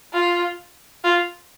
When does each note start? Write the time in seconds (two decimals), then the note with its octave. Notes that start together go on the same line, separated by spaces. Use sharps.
0.13 F4
1.04 F4